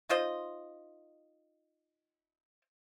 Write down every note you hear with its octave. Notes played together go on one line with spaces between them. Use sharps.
D#4 F4 C5 D#5